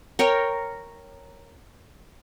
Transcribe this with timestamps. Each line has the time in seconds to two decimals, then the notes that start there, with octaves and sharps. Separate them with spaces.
0.19 A#4 C#5 G5